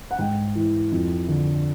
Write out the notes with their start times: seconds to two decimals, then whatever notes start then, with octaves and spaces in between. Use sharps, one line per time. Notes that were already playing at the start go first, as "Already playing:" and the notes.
0.11 F#5
0.19 G#2 G5
0.55 E3
0.92 F2
1.28 D3